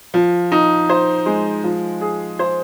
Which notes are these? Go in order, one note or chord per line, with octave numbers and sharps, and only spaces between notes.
F3
D#4
C5
G#3
F3
G#4
C5